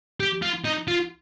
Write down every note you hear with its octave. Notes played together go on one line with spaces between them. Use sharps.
G4
F4
D#4
F4